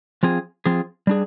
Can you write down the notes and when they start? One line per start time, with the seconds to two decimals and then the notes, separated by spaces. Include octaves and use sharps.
0.23 F3 C4 F4 G#4
0.66 F3 C4 F4 G#4
1.07 G3 D4 G#4